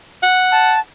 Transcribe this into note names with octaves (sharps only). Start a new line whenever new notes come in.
F#5
A5